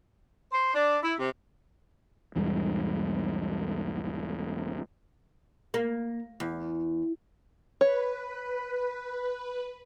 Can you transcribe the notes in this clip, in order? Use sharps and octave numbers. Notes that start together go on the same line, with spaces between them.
C5
D4
E4
C3
B1 E2 G#2 G3
A#3
E2
B4 C#5